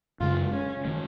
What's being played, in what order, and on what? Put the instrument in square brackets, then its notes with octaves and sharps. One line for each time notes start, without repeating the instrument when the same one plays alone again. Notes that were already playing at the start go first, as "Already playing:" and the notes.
[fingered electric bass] F#2 C#3 G#3 [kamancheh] F4
[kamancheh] C#4
[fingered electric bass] D#3 G#3